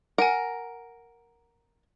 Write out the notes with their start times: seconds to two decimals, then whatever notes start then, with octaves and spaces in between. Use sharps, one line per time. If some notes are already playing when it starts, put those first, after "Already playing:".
0.18 A#4 F#5 G#5